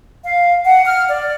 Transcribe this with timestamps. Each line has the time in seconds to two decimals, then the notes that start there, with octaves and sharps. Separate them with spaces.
0.25 F5
0.65 F#5
0.85 F6
1.09 D5